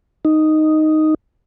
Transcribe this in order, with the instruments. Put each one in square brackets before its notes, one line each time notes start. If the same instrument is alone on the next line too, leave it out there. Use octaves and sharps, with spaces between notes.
[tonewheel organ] D#4